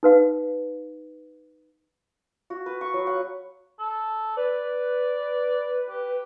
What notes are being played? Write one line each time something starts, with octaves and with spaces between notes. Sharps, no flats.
D#4 B4 F5
F#4
B4
C#6
F#3
F#5
A4
B4 D5
G4